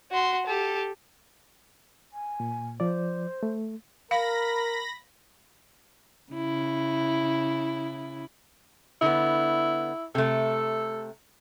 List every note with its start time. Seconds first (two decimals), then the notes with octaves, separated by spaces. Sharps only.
0.12 F#4 C6
0.46 G4 A4
2.13 G#5
2.40 A#2
2.80 F3 C5 D5
3.43 A3
4.11 A#4 F5 B5 A#6
6.32 C#3 E4
9.02 D3 B3 E4
10.15 C3 A3 A4